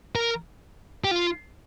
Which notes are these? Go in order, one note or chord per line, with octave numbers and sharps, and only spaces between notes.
A#4
G4
F4